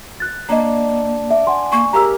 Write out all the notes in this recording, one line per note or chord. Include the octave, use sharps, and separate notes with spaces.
F#6 A6
A#3 D4 D#5 A#5
E5 D6
F#5 G#5 C6
A#3 C#6
G#3 A#3 G4 A#5 E6